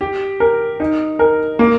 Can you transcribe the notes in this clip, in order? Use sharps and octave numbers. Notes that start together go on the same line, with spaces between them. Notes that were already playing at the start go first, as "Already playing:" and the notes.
G4
A#4
D#4
A#4
A#3